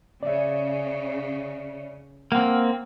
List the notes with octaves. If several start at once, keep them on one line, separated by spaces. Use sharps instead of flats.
C#3 D5 E5
A#3 C4 F#5 F6